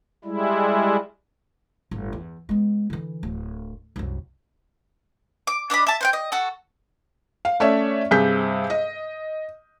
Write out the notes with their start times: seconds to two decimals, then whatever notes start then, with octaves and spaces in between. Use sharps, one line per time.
0.25 G3 G#3 E4
1.91 G1 A2
2.13 E2
2.49 G#3 B3
2.90 D3 E3
3.23 D1
3.96 C2 F#2
5.47 D6
5.70 D4 D5 D#5 B5
5.87 E5 A5
6.01 C5 F#5 G5
6.13 D#5
6.32 F#4 A4
7.45 F5
7.60 A3 C#4 C#5 D5 E5
8.11 G2 C3 G#4 G6 B6
8.70 D#5